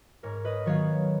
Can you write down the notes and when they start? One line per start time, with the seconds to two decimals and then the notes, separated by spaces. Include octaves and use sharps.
0.23 G#2 A#4 C#5
0.45 B4 D#5
0.65 D#3 F#3 B3 C#5 F5